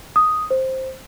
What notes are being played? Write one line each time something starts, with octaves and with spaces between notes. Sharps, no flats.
D#6
C5